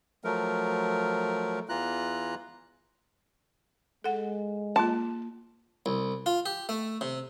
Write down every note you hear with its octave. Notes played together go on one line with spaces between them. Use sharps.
F3 F#3 A3 A#4
E2 E3 F4 A#5 F#6
G#3 A4 F#5
A#3 F4 A5 C6
C2
F4
G4
A3
C3